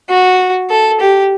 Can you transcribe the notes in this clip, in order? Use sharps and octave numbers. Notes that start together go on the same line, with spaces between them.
F#4
A4
G4